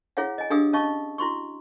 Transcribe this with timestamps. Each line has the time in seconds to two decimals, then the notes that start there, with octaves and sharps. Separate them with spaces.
0.17 E4 G#4 C#5 F5 F#5
0.38 D#5 G#5
0.50 D4 G4 G#4 F5 D#6 E6
0.73 C#4 D#5 F5 A5 C#6
1.18 E4 F#4 C6 C#6